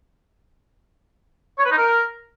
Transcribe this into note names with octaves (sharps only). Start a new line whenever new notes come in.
C#5
B4
D#4
A#4